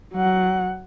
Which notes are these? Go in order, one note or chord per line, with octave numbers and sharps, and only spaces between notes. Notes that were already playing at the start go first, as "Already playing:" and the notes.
F#3 F#5